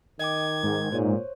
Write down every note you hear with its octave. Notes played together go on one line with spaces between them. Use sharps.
D#3 D#5 G5 D6 G#6
G#2
A#2 C5 C#5